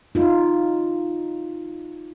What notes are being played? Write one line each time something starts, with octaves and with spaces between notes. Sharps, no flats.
D#4 F4